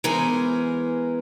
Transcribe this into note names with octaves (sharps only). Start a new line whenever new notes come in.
E3 G#3 B3 A#4 C5 G#5